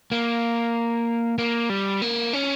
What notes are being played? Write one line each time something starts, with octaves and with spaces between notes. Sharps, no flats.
A#3
A#3
G3
A#3
C#4